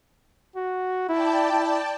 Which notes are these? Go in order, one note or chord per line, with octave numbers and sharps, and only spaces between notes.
F#4
E4 D5 G5 A5
E4